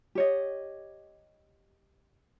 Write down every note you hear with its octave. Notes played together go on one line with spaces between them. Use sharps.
G4 C#5 D#5